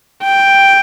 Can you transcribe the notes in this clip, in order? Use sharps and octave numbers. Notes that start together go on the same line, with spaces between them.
G5